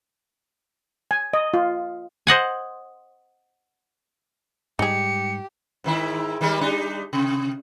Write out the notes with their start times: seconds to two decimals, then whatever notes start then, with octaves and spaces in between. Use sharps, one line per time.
1.11 G#5
1.33 D#5
1.54 F4
2.27 C5 D#5 F#5 G#5
4.79 G#2 G3 D#4 G4 G#4 C#7
5.84 G#2 D#3 E4
6.41 D#3 G3 G#3
6.61 G3 D4 D#4
7.13 C3